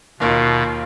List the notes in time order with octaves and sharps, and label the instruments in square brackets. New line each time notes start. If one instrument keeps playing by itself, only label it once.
[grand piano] D#2 D#3 A#3 F4 [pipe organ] B2